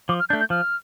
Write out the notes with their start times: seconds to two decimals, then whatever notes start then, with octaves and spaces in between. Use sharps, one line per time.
0.09 F3 D6
0.20 F6
0.29 A3 D4 G6
0.40 G6
0.50 F3 F6